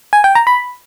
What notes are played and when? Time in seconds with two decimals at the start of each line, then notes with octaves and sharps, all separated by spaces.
0.13 G#5
0.24 G5
0.35 A#5
0.47 B5